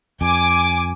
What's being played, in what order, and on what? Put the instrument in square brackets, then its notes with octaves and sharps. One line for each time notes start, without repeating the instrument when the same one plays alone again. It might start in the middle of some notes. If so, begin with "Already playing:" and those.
[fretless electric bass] F2 [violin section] G#5 D6